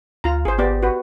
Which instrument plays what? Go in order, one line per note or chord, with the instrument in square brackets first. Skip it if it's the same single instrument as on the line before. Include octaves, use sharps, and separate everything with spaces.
[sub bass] D2 [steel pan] F4 A#5
[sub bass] G#1 [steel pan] G#4 C5
[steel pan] B3 G4 D5
F#4 B4